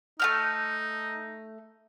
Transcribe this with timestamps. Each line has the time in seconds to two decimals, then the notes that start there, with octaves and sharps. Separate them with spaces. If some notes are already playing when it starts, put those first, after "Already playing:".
0.20 A3 D#4 G4 F6